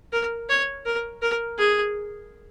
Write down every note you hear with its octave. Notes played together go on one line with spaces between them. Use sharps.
A#4
C#5
A#4
A#4
G#4